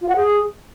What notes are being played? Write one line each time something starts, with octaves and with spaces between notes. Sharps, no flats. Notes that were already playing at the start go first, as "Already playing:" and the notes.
F4
F#5
G#4